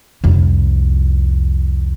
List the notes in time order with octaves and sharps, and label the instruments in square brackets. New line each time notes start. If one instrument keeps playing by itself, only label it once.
[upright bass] C2 F2